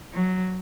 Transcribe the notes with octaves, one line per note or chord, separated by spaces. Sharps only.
F#3